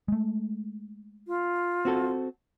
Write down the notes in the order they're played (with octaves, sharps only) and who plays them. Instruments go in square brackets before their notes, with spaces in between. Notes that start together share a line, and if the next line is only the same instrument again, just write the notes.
[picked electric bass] G#3 A3
[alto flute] F4
[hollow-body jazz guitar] C4 F#4 A4